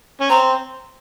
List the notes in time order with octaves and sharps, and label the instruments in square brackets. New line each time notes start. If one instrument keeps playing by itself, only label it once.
[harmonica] C#4
[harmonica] C4 [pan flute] A#5